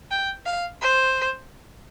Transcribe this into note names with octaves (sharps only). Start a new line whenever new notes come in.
G5
F5
C5